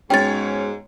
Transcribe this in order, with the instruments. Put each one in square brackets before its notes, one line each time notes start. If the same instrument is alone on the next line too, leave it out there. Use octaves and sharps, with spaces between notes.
[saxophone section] G#2 [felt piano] G#3 B3 F#4 [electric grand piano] C#4 C#5 [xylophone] G5 A6